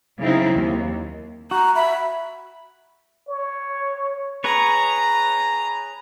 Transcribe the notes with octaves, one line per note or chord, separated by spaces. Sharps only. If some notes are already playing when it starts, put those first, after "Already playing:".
C#3 F#3 C4 D#4 E4
D#2
F#4 A#5
E5 B5
C#5
G#4 B4 C#5 A#5